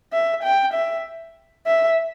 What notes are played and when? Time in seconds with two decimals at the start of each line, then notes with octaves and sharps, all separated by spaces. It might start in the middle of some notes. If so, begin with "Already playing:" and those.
0.12 E5
0.43 G5
0.74 E5
1.66 E5